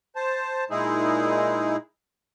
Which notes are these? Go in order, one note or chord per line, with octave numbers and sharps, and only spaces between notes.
C5 A5
A#2 G#3 D#4 E4 G#4